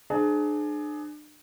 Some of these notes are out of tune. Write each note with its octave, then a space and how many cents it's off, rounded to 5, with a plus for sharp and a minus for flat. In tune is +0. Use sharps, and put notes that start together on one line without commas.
D4 +35 G#4 +25 C5 +0